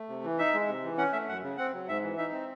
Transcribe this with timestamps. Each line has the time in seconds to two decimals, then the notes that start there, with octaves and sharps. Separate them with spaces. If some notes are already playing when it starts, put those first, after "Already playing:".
Already playing: A3
0.09 C3
0.24 E3
0.39 D#4 E5
0.54 G#3
0.68 C3
0.83 E3
0.98 C#4 F#5
1.13 A3 E5
1.28 F#2 F#5
1.43 C#3
1.57 C4 F#5
1.73 F#3
1.88 G#2 E5
2.03 E3
2.18 D#4 E5
2.32 C4